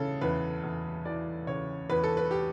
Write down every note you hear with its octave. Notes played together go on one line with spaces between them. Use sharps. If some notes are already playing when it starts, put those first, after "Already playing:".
Already playing: C#3 E3 A4
E2 B4
E2
E3 D5
C#3 C#5
E2 B4
A4
B4
G4